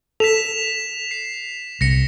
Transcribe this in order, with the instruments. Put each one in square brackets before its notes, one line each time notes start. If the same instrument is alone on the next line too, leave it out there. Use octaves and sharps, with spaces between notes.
[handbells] A4 [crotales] B6 E7 F7
[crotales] C7
[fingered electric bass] C2 [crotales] A#6 C#7